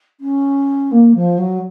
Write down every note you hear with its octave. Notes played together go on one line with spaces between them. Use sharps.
C#4
A#3
F3
F#3